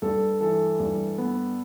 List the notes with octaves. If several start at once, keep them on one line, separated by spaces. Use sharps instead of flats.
G2 A4
E3 A4
G2
B3